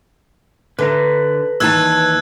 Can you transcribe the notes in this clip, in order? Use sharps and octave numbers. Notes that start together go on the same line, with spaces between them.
D3 B4 E5 A#5
D#2 E3 A5 E6 F#6 G#6